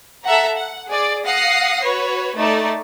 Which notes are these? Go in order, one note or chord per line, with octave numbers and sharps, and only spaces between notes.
A4 E5 F#5 A#5
F#5
G#4 D5
F5 F#5 D#6 A#6 C7
F#4 B4 C#5
A3 D#4 D5